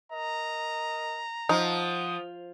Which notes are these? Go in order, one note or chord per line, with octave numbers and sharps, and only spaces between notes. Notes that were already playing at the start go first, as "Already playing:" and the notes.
A#4 D#5 A#5
F3 D#4 F#5 D#6